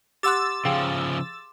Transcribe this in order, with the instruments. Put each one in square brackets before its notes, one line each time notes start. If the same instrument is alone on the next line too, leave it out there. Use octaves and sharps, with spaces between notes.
[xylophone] G4 F#5 F#6 [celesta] C6 D6 [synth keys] E6 A6
[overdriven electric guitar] C#3 F3 [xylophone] G#4 F5 G5